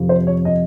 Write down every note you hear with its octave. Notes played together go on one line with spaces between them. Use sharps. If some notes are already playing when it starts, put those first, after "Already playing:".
Already playing: F2 C3 F3
C5
C#5
D#5